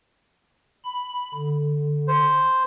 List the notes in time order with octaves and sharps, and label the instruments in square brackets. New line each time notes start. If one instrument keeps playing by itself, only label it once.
[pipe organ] B5
D3
[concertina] C5